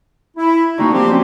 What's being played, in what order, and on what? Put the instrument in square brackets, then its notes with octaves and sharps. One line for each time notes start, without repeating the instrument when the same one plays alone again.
[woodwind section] E4
[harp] D3 A#3 [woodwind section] C4 D#4 F#4
[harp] F3 [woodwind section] C4 G4
[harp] C#4 F#4